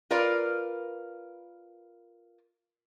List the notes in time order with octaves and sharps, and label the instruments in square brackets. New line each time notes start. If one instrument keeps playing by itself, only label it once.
[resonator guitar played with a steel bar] F4 A#4 B4 D5 F5